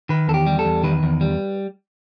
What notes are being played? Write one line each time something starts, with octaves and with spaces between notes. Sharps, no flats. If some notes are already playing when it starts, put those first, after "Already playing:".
D#3 B4
E2 A4
G4
G3
A4
E2
D#3 B4
E2
G3